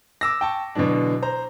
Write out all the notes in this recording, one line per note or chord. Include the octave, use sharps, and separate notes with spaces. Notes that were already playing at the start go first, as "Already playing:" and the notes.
D6 E6 A#6
G5 A5 C#6
B2 D3 E3 F#3 D4
C5 A#5